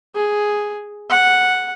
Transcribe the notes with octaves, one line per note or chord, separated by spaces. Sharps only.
G#4
F#5